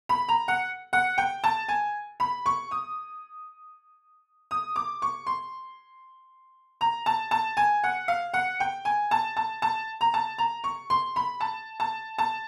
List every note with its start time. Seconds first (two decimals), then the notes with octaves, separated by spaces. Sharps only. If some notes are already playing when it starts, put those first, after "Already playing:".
0.09 B5
0.28 A#5
0.48 F#5
0.93 F#5
1.18 G5
1.44 A5
1.68 G#5
2.20 B5
2.46 C#6
2.71 D#6
4.51 D#6
4.76 D6
5.02 C#6
5.27 C6
6.81 A#5
7.06 A5
7.31 A5
7.57 G#5
7.84 F#5
8.08 F5
8.34 F#5
8.60 G5
8.85 G#5
9.11 A5
9.37 A5
9.62 A5
10.01 A#5
10.14 A5
10.38 A#5
10.64 C#6
10.90 C6
11.16 B5
11.41 A5
11.80 A5
12.18 A5